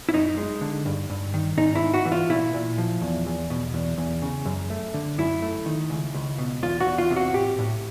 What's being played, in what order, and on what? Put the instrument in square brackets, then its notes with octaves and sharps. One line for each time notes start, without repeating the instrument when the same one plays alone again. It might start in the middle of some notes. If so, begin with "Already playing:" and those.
[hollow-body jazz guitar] E4
F#2 D#4
G#3
D3
G2
G2
D#3
G#2 D#4
E4
G#2
F#4
E3
F4
A#2 E4
A#2
F3
E2
E2
B2
E2
E2
C#3
F#2
A3
D3
F#2 E4
A3
D#3
C#2
C#2
B2
E2 F4
F#4
E2
F4
C3
F#4
A2 G4
A2